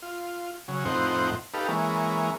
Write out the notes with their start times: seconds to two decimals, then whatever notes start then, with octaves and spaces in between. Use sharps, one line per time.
0.02 F4
0.68 C#3 F#3
0.85 F2 A2 C4 D#4 C5 F#5
1.54 D#4 G4 A4 B4 F5
1.68 E3 G#3 A#3 C#4